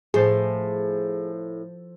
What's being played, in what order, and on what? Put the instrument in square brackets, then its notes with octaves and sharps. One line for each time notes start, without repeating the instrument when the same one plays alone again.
[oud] A2 [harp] F3 C5 A5 [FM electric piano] G#4